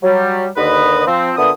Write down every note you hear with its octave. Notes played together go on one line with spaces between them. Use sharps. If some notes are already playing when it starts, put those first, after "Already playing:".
F#3 G3
D#2 D3 B4 D#5
F3 C4
A#2 D3 B3 E5 D#6